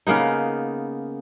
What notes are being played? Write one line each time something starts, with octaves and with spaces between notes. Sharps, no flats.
C#3 A#3 B3 D#4